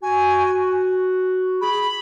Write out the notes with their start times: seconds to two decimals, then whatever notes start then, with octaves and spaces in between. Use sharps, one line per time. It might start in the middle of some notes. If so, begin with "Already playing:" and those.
0.02 F#4 G#5
1.61 G#4 B5